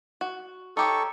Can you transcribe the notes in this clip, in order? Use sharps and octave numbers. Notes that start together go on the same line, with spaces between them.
F#4
D#4 G4 A4 C#5 C#6